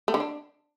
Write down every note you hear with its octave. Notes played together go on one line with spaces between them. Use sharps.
A3
D3
D4